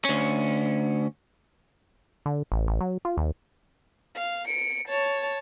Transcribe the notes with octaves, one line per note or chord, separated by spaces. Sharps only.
D2 C#4
D3
A1
A1
F#3
F4
D#2
F5
C#7 D7
C#5 A5